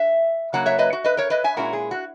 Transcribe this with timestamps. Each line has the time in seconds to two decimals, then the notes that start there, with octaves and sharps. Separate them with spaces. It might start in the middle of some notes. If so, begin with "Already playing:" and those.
Already playing: E5
0.53 C#3 F#3 A#3 F#5
0.66 C#5 E5
0.79 B4 D#5
0.93 F#4
1.04 B4 D#5
1.17 A#4 C#5
1.30 B4 D#5
1.44 E5 G#5
1.56 A#2 G#3 C#4 E4 F#4 A#4
1.73 G#4
1.91 F#4